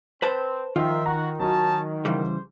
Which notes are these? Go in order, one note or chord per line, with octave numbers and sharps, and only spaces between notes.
C4 B4 C5 A5
D#3 F3 F4 A#4 E5 G5 C6
F#4 F#5 A#5
F#3 C#4 D#4 F#4 A5
C#3 E3 G3 C5